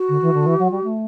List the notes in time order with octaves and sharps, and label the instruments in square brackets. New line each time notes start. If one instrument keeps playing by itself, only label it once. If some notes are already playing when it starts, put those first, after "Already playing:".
Already playing: [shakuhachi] F#4
[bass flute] D3
E3
D3
E3
F#3
G3
A3